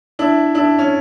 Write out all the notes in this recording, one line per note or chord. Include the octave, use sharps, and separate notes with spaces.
D4 E4
D4 E4
C#4